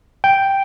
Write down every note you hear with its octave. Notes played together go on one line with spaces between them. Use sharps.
G5